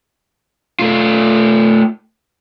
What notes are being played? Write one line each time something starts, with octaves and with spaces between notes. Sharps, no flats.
A3 F4